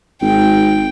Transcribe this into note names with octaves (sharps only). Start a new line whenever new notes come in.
G#1 G5